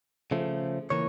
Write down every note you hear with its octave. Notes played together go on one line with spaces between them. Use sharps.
C#3 F3 A3
C#3 E3 A#3 C#5